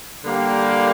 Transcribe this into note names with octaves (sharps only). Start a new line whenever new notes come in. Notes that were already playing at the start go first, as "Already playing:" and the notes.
D3 G3 A#3 G4